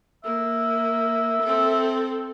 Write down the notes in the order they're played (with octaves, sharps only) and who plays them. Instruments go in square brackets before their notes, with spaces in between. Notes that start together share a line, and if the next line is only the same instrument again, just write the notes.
[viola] A#3 [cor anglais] E5
[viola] C4 A4